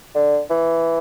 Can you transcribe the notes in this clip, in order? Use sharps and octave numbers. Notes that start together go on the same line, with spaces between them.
D3
E3